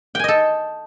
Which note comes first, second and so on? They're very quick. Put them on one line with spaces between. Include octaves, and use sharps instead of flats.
G5 G#5 D#5 A4